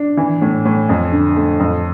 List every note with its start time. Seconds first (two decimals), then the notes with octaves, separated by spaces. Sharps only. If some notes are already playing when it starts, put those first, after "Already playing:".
Already playing: D4
0.17 E3
0.42 A2
0.65 A2
0.89 F2
1.12 D3
1.36 A3
1.60 F2